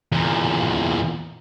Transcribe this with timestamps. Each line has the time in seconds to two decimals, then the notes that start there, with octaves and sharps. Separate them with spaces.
0.12 E2 A#2